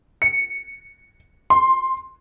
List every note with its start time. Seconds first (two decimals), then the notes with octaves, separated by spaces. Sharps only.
0.22 C#7
1.50 C6